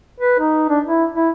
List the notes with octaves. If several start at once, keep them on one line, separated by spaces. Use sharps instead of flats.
B4
D#4
D4
E4
E4